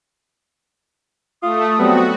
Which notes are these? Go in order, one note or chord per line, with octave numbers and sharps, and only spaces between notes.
A3 F4 D#6
F#3 G3 B3 C4 F#4